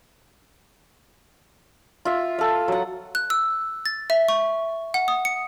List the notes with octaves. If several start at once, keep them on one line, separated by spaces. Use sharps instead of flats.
F4 E5
A4 F5
F#3 F#5
F#6
E6
A6
E5
C#6
F#5
D#6
C#7